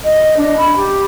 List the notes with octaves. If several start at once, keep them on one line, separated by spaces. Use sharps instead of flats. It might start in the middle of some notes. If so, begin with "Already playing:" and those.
D#5
D4
B5
G4